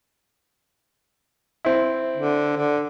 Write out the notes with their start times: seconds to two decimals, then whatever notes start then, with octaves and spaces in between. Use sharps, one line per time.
1.65 C4 E4
2.17 D3
2.56 D3